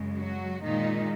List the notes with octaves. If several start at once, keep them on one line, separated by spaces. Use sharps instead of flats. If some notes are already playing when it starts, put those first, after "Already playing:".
Already playing: F#2 C#3 G#3
F#3 F#4
A#2 D#3 G#3 D#4